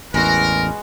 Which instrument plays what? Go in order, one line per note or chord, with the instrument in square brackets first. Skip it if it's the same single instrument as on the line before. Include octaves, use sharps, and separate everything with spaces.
[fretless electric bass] A1 E2 [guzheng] G#3 B3 F#4 [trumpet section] A#4